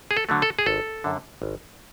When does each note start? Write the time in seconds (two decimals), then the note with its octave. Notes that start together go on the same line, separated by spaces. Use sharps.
0.11 G#4
0.17 A4
0.29 D3 F#3 A3
0.42 A4
0.59 G#4
0.66 G#1 A4
1.04 F#2 D3
1.42 G#1